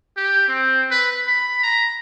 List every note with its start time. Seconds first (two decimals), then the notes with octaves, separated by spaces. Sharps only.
0.17 G4
0.48 C4
0.91 B4
1.28 B5
1.63 A#5